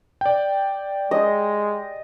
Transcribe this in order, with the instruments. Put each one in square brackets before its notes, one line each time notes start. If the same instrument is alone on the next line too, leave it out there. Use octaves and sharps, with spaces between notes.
[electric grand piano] D5 G5
[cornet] G#3 [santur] D#5